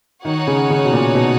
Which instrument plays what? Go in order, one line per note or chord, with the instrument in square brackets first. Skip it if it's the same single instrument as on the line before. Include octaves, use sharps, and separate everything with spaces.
[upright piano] D#3 [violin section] D#4 F#4 C#5 F#5
[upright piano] C#3
C#3
B2
A#2
B2